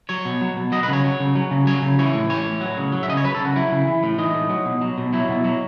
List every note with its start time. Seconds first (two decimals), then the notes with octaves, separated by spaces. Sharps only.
0.09 F#3 C#5
0.25 B2
0.41 F#3
0.57 B2
0.72 F#3 D#5
0.83 B4
0.88 C#3 C#5
1.04 F#3
1.20 C#3
1.35 F#3
1.51 C#3
1.67 F#3 C#5
1.82 C#3
1.99 E3 C#5
2.14 A2
2.29 E3 C#5
2.46 A2
2.61 F#3
2.77 C#3
2.92 F#3
3.03 E5
3.08 C#3 D#5
3.17 C#5
3.24 F#3 B4
3.35 A4
3.40 C#3 F#4
3.56 F#3 E4
3.72 C#3
3.87 E3
4.03 A2
4.18 E3 D#4
4.34 A2
4.49 F#3
4.65 B2
4.81 F#3
4.98 B2
5.13 F#3 E4
5.28 B2
5.44 F#3